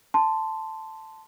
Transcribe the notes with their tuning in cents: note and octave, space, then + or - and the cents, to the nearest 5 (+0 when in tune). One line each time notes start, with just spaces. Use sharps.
A5 +0 C6 -10